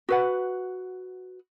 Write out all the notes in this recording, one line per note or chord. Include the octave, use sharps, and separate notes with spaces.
F#4 B4 F#5